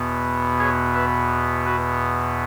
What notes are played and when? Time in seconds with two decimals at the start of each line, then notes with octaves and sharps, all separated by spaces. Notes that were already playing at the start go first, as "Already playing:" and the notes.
Already playing: E2 B2 B3
0.59 G#4 C#5
0.94 B4 E5
1.65 F#4 B4